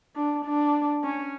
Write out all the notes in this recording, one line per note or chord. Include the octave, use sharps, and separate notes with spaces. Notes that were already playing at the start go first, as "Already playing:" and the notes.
D4
D4
C#4